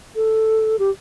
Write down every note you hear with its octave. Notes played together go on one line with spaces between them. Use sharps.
A4
G4